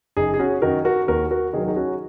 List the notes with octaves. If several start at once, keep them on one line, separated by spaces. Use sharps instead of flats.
F#1 D#4 G#4
G#4
C#4 F#4
F#2 D#3 F#4 A#4
F#4 A#4
D#2 F#4 A#4
F#4 A#4
D#3 F#3 G#4 A#4
D#4 G#4
C#4 F#4